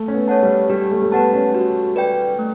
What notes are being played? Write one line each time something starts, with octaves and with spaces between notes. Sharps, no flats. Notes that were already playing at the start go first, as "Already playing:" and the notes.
Already playing: A3
C#4
B3
A4 C#5 F#5 A5
G3
G3 G4
A3
A3
B3 B4 F#5 A5
C#4
F#4
B4 D5 G5
A3